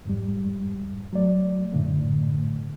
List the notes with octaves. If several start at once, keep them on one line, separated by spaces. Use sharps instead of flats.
F2 G#2 G3
F#3 A3 D5
F#2 A2 D3 A3